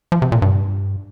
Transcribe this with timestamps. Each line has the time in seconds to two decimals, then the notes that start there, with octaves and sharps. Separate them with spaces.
0.12 F3
0.22 C3
0.32 A#2
0.42 G2